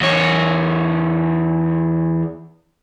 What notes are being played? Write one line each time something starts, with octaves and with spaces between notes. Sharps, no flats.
E2 C#5